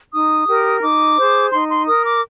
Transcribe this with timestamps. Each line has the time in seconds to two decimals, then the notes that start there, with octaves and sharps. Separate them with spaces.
0.13 D#4 D#6
0.47 G4 A#4
0.82 D#4 D6
1.18 G#4 C5
1.52 D#4 C6
1.70 C6
1.87 A#4 D#6
2.05 D6